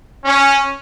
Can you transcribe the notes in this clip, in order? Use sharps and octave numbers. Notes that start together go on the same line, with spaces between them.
C#4